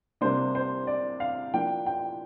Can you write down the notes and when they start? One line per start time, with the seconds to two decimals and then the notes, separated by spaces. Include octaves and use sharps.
0.21 C3 G3 A#3 D4 C5
0.55 C5
0.87 D5
1.20 F5
1.54 F3 A#3 D4 G5
1.86 G5